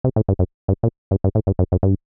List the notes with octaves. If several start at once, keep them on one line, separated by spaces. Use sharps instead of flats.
C3
A2
G2
F#2
G2
A#2
G2
G2
A2
G2
F#2
F#2
G2